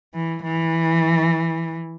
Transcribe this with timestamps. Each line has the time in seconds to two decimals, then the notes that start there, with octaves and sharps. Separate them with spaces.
0.14 E3
0.43 E3